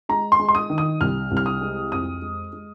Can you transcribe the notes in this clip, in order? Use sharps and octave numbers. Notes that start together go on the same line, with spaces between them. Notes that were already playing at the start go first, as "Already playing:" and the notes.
G#3 A#5
C6
G#3
C6
D#6
D#3
D#6
C2 F6
C2
F6
D#6
G#3
F2 D#6
G#3
G#3